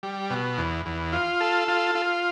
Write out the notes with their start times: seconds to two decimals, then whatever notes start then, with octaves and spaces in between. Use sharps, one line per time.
0.03 G3
0.30 B2
0.58 E2
0.86 E2
1.13 F4
1.41 A4
1.68 F4
1.95 F4